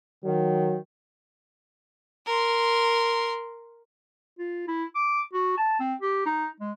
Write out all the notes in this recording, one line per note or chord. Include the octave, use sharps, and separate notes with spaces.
D#3 F#3
A#4 C6
F4
E4
D6
F#4
A5
C4
G4
D#4
G#3